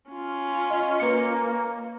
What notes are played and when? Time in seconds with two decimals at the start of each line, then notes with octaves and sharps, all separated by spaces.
0.11 C#4 F4
0.71 D#5
1.00 A#3 B4 C#7